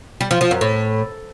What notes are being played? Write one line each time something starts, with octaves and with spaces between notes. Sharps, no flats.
G3
F3
F3
F#2
A2